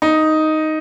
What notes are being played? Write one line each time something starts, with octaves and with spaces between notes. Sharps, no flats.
D#4